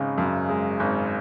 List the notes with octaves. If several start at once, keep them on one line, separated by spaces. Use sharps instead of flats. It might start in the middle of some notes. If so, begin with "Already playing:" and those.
Already playing: G#1 C#3 G#3
F#2
G#3
G#1